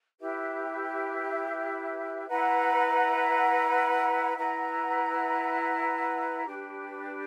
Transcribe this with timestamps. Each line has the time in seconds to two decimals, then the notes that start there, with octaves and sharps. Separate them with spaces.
0.20 E4 G4 B4 E5
2.28 E4 B4 F#5 A#5
4.37 E4 B4 F#5 A#5
6.46 D4 G4 B4